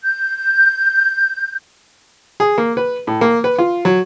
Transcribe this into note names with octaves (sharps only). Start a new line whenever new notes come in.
G6
G#4
A#3
B4
A2
A#3
B4
F4
F#3